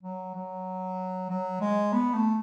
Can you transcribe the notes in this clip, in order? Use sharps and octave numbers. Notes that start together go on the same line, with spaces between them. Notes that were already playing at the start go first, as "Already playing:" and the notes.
F#3
F#3
F#3
G#3
B3
A3